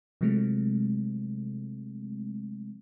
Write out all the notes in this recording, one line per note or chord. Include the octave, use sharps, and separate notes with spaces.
C3 F3 F#3 G#3 A3 C4